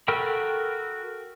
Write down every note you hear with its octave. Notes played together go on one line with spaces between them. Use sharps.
F#4 A4 A#4 G5 B5